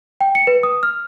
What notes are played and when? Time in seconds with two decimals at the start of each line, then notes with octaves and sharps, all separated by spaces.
0.21 G5
0.35 C#7
0.47 B4
0.63 D#6
0.83 F6